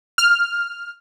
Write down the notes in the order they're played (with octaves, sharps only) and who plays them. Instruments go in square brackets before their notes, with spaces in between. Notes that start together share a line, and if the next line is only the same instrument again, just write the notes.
[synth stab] F6